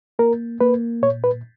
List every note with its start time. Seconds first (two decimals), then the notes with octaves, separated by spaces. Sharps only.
0.19 A#3 A#4
0.61 A#3 B4
1.02 A#2 C#5
1.24 B4